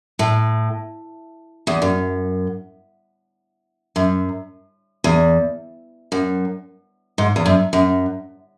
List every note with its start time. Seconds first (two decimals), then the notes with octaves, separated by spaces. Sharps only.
0.19 A2
1.67 E2
1.82 F#2
3.96 F#2
5.04 E2
6.12 F#2
7.18 G#2
7.36 E2
7.46 F#2
7.73 F#2